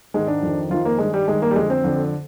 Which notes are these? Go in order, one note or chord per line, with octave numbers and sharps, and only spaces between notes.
G#2 D#3 G#3
D4
F2 D#3
F2 D#3 F4
A#3
G2 D#3 G#3
G3
G2 D#3 G#3
A#3
G3
F2 D3 G#3
C4
F2 D3